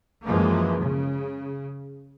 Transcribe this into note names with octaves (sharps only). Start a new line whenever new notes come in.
F#2 E3 F3 G#3 A#3
C#3